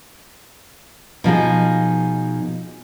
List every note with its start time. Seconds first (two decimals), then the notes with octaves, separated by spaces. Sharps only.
1.24 B2 F3 D#4 G#4